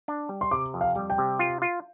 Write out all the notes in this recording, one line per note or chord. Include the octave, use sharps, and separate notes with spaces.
D4
G3
C6
C3 D6
F2
F5
G3
G5
C3
F4
F4